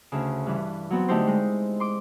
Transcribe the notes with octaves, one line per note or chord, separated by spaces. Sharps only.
D2 C#3
G2 E3
F#3 B3 C4
D3 A3 D#4 E4 G4 C5
G#3
C6 D6